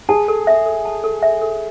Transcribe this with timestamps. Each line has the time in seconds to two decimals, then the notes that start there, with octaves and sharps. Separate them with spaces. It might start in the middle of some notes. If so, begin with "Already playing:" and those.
0.09 G#4 A5
0.28 A4
0.47 E5
0.66 A4
0.85 A5
1.04 A4
1.23 E5
1.42 A4